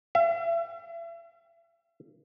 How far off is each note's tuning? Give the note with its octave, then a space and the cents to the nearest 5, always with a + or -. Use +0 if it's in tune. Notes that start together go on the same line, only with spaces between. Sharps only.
E5 +40